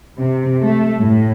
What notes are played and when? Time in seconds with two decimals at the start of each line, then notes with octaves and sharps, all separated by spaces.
0.18 C3
0.62 A3
1.00 A2